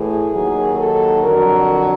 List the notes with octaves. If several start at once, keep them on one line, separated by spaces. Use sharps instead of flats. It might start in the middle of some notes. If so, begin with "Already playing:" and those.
Already playing: A2 E3 G#4
D#2 D#3 F#3
A4
F2 D3 F#3 A#4